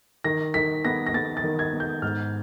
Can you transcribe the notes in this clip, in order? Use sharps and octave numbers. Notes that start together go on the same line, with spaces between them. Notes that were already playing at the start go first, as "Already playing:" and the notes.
D#3 A#6
D#3 B6
B3 A#6
A#6
B3 A6
A6
D#3
G#6
B3
G6
G#2 F6